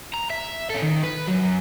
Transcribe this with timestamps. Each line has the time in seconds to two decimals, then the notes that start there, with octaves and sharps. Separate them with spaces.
0.14 A#5
0.30 E5
0.70 C#4 A4
0.82 D#3
1.03 B4
1.28 F#2 F#3